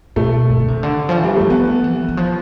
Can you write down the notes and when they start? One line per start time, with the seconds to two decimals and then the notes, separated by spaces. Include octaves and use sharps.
0.16 B2 A3
0.50 C3
0.59 D3
0.68 C3
0.83 D3
1.09 F3
1.17 E3
1.23 G3
1.37 E3 A3
1.50 F3 B3
1.84 E3
2.08 E3
2.17 F3